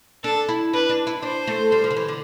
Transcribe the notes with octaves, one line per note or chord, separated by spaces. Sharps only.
D4 A4
E4
D4 B4
D4
E4
D4 C5
A3
G3
F3
D3
E3
D3